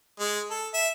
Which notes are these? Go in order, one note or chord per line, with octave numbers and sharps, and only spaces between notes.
G#3
A4
E5